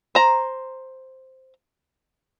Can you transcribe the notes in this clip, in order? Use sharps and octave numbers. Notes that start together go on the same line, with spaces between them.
C5 A#5